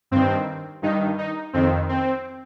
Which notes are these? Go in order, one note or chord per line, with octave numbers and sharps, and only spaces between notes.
G2 D#3 C4
G2 D#3 D#4
D#4
F2 D#3 C4
C4